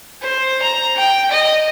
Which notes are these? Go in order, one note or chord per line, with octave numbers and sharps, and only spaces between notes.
C5
A#5
G5
D#5